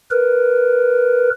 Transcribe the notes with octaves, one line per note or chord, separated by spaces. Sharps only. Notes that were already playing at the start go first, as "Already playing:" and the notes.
A#4 B4